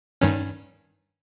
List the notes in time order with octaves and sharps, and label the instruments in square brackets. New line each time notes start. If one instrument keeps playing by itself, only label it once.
[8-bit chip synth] G2 D#3 C#4